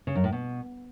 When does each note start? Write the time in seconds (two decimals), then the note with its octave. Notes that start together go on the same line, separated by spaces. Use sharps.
0.07 C#3
0.15 F#2
0.24 A2
0.32 B2